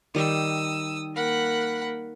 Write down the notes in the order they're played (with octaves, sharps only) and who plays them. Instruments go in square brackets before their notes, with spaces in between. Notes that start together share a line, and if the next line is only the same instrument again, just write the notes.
[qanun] D#3 G3 [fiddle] D#6 E6
[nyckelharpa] A#3 A#4 [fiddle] F#5 B5